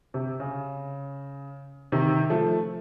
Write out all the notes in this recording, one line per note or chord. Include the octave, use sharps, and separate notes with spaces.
C3
C#3
C3 D#3
F3 A3